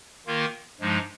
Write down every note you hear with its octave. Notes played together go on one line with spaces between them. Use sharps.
D#3 A#3 F4 A#4
G2 F3 G#3 D#4